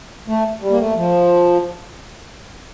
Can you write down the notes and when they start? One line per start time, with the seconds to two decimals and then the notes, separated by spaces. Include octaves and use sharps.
0.28 A3
0.61 G3
0.70 A#3
0.79 A3
0.96 F3